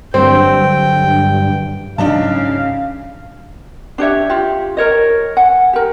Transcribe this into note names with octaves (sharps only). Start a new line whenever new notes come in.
G2 D3 F#3 C4 G5
G#2 C#3 F#3 D4 D#4 F5 A5
D4 G4 C#5 E5
F4 G4
A#4 C#5 D#5
F#5 G#5
G4 A#4